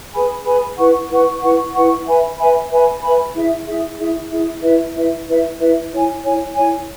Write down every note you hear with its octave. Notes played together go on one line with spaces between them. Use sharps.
G#4 B4 G#5 B5
G#4 B4 G#5 B5
E4 B4 F#5 C#6
E4 B4 F#5 C#6
E4 B4 F#5 C#6
E4 B4 F#5 C#6
B4 E5 G#5 B5
B4 E5 G#5 B5
B4 E5 G#5 B5
B4 E5 G#5 B5
E4 G#4 E5
E4 G#4 E5
E4 G#4 E5
E4 G#4 E5
E4 B4 E5
E4 B4 E5
E4 B4 E5
E4 B4 E5
E4 C#5 G#5
E4 C#5 G#5
E4 C#5 G#5